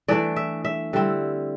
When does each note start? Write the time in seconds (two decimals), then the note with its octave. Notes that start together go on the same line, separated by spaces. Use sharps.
0.08 E3 A3 D4 D5
0.36 E5
0.65 E5
0.93 D3 G3 C4 E4